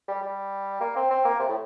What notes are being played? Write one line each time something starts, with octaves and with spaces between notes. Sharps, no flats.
G3
G3
A#3
C4
C4
A#3
C3
A2